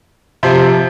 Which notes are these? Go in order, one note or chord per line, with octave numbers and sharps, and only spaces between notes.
C3 F3 C4